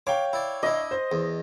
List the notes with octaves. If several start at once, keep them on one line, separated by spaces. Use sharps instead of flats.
C#5 F5 G5 D6
E4 D5
D4 E4 D#5
C5
E2